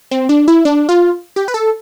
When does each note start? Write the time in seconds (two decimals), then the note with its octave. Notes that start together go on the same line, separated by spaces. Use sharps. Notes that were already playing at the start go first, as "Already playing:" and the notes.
0.11 C4
0.29 D4
0.48 E4
0.65 D4
0.89 F4
1.36 G4
1.48 B4
1.54 A4